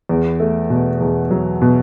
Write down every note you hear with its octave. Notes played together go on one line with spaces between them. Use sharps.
E2
A3
B2
E2
F#3
B2